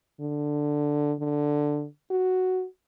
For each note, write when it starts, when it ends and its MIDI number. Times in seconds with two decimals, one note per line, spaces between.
0.21 1.13 50
1.20 1.85 50
2.11 2.65 66